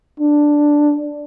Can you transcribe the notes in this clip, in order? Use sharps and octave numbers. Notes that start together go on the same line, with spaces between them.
D4